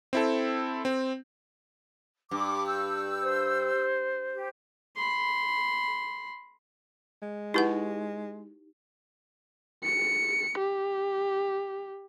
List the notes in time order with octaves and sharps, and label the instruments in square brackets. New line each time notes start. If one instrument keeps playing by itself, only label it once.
[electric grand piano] C4 E4 A4
C4
[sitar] G2 [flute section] D6
[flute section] E6 G6
[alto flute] C5
[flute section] G4
[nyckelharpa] B5 C6
[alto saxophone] G#3
[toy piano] D#4 G4 [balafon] E4 B4 F#5
[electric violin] C#7
G4